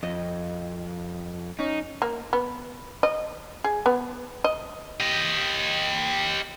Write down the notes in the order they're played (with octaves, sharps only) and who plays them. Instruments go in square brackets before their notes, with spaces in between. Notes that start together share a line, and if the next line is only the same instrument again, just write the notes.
[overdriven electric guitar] F2 [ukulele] D#5
[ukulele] C#4 [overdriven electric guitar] D#4
[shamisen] A#3
B3
D#5
G#4
B3
D#5
[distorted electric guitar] G4 D#5